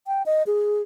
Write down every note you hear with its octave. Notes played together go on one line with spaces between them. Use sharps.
G5
D#5
G#4